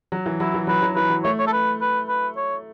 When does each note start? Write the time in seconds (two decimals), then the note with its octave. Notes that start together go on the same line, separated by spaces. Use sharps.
0.12 F#3
0.26 E3
0.39 F#3 E4
0.54 E3
0.67 F#3 B4
0.82 F#3
0.95 E3 B4
1.10 F#3
1.24 A3 C#5
1.39 C#5
1.47 A4
1.53 B4
1.81 B4
2.08 B4
2.37 C#5